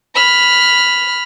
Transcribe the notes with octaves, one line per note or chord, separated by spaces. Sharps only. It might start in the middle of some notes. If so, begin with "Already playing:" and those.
B5 F6